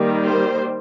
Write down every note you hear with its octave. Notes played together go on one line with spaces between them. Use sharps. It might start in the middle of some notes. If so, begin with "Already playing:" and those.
Already playing: D#3 G3 A#3
C5